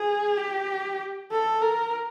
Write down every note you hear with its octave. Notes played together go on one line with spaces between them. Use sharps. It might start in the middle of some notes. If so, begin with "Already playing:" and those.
Already playing: G#4
G4
A4
A#4